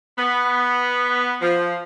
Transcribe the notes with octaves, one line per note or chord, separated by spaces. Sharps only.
B3
F3